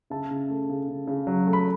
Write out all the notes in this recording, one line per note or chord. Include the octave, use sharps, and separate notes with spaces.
C#3 E5 A5
C#3
A3
C#3
C#3
C#3
F#3
A3
B5